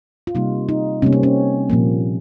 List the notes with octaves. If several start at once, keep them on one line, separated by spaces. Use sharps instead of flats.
F4
C3 G3 A#3 D#4
D#4
C3 G3 A#3 C#4
C4
C#4
A#2 F3 A#3